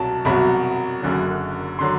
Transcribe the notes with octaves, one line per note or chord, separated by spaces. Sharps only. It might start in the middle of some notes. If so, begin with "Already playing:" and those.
Already playing: C2 B2 F#3 A5
C2 B2 F#3 B5
F#1 F#2 D3 F#3
D3 F#3 C6